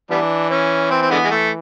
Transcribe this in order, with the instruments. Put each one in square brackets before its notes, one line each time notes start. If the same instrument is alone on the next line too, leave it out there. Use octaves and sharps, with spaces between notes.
[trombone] E3 [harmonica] G3 B3 D4
[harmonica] C#4
C4
C4
D3 G#3 B3
G#3
A3